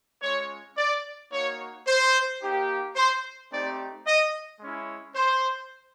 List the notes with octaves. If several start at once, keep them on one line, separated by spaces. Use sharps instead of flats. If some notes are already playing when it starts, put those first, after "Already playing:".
G#3 C#4 F4 C#5
D5
A#3 D#4 F#4 C#5
C5
A#3 D#4 G4
C5
A3 C4 D#4 G4 D5
D#5
G#3 C#4 E4
C5